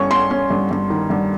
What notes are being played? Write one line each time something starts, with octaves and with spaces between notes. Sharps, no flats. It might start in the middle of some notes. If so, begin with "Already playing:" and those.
Already playing: G2 C#4 C#6
C#4 C6
C#4
G2
G2
D#3
G2